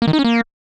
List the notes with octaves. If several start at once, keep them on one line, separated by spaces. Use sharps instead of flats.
A#3
D#3
D#4
C#4
A#3